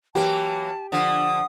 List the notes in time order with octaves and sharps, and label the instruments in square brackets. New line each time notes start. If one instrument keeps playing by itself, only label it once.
[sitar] E3 F#3 A#3 [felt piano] G4 [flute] A5
[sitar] D3 F3 [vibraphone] F#5 [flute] D#6